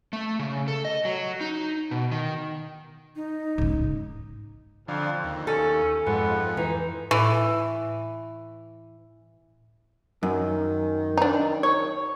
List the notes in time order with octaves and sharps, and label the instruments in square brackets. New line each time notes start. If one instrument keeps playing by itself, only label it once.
[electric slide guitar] A3
C#3
A4
D#5
F#3
D#4
B2
D#3
[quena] D#4
[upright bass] G#2 C#3
[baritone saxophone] F2 [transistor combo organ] D3 F3
[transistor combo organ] D#2
[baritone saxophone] C#4 [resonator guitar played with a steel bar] A4
[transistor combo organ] F2 [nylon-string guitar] G#2 [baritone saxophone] B3
[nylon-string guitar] E3 [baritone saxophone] D#4
[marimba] A2 [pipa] E3
[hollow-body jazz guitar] F#2 [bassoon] D#3
[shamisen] D4 D#4
[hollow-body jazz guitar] C#5